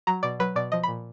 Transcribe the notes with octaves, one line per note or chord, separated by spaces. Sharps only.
F#3 A#5
B2 D5
F#3 B4
B2 D5
F3 D#5
B5
A#2